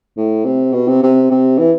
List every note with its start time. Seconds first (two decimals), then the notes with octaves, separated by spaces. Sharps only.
0.17 A2
0.45 C3
0.73 B2
0.88 C3
1.03 C3
1.31 C3
1.59 E3